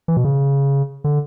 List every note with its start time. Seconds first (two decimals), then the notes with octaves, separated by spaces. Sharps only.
0.08 E3
0.17 B2
0.25 C#3
1.04 D3